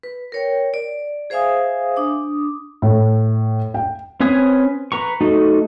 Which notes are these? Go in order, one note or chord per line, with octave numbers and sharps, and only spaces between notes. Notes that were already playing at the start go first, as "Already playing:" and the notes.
B4
A#4 C#5 G5
D5
G#4 C5 E5 F5 G#5 D#6
D4 D6 D#6
A2
G5
C4 C#4 B4 G#5 D#6
B4 A#5 C#6
A3 D#4 F#4 A4